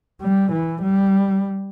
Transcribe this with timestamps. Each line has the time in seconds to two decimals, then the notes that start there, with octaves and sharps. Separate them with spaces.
0.22 G3
0.52 E3
0.82 G3